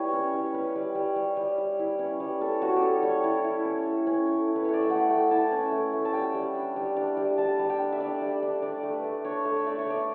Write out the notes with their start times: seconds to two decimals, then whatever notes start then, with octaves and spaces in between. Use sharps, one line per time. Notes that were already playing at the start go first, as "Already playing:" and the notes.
Already playing: G3 E4 B4 C#5
0.13 C#4
0.34 G3
0.54 C#4 B4
0.76 G3
0.95 G3
1.16 G3
1.37 G3
1.58 G3
1.79 E4
1.99 C#4
2.20 G3
2.41 C#4 A4
2.62 C#4 F#4
2.76 G4
2.82 G3 A4
3.03 G3 C#5
3.24 E4
3.44 E4
3.65 C#4
3.86 A3
4.07 C#4
4.27 A3
4.48 E4
4.56 B4
4.65 A3 C#5
4.73 D5
4.81 E5
4.90 A3 F#5
5.10 A3 G5
5.31 E4 A5
5.52 C#4
5.72 A3
5.93 A3
6.05 A5
6.14 G3 G5
6.34 G3
6.55 D4
6.76 G3
6.97 D4
7.17 G3
7.38 G3 A5
7.59 G3
7.70 G5
7.80 D4
7.92 E5
8.00 D4 D5
8.21 G3
8.43 D4
8.62 D4 D5
8.83 A3
8.94 B4
9.04 A3
9.25 D4 C#5
9.45 A3
9.57 E5
9.67 A3 D5
9.79 C#5
9.87 A3 D5